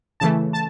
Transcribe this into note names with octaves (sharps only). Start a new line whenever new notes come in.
C#3 E3 A3 A5
A5